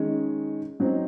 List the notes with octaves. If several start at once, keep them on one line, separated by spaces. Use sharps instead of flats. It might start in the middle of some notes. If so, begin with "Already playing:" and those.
Already playing: D#3 G#3 C#4
F#3 C4 D#4